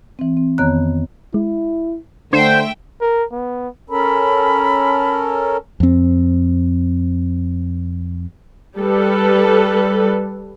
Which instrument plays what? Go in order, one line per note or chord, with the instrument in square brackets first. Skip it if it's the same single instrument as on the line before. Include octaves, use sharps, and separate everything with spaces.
[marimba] E3 C4
C4
F2 D#3 B3 C#5 A#5 F#6
[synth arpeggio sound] G#3 [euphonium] E4
[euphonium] D3 [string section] A3 E5 G5 [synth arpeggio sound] D4 [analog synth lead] C5
[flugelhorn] A#4
B3
[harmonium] C#4 A4 A#4 [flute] B5
[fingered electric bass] F2 C4
[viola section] G3 A4 B4